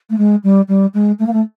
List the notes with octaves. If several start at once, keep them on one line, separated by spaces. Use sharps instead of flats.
A3
G#3
G3
G3
G#3
A3
A#3
A3